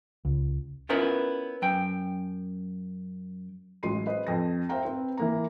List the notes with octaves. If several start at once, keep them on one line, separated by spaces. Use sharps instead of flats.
C#2
B3 C#4 E4 F4 A#4 B4
F#2 G5
A1 F#3 G#3 C6 C7 D#7
B4 C5 D#5
F2 A#6
C5 E5 F5 G5 A#5
C4 B4
E3 A#3 A#5